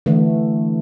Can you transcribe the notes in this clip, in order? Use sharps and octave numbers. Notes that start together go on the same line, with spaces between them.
D3 E3 A3